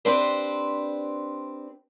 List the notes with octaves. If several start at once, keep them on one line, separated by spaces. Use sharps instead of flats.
C4 D4 G4 B4 C5